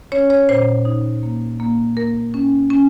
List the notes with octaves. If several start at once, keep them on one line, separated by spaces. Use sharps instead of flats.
C#4 C#5
C#5
A#2 C5
D#4
A#3
A#3
A#3 A#4
C#4
C#4